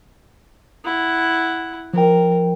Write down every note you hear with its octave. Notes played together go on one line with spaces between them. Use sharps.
E4 F#5
F3 A#4 G5